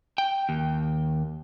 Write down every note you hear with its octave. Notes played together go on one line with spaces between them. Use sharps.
G5
D#2